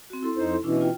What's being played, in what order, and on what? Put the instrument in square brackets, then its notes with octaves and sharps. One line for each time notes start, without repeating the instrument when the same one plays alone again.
[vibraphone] C4 F#4
E4 A4 C6
[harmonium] F2 D#4 C5
[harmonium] B2 E3 [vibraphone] C#4 D4 E4
[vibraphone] F4 G5